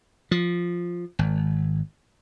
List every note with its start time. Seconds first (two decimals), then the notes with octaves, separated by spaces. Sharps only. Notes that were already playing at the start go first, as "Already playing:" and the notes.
0.31 F3
1.19 G#1